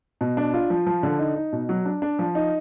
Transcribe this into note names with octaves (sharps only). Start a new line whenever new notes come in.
B2
D4
F4
F3
F3
D3
D#4
D#4
B2
F#3
D4
D4
F3
D#4